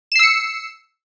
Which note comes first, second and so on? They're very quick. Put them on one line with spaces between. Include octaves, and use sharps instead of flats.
E7 C7 E6 C#7